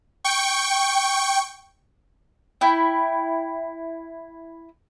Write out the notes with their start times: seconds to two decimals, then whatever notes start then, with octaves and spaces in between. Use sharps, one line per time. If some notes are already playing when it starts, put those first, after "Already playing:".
0.24 G5 C#6
2.61 E4 G5